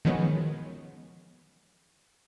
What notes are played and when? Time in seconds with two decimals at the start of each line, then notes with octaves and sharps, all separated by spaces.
0.05 D#3 F3 F#3 G#3 B3 C#4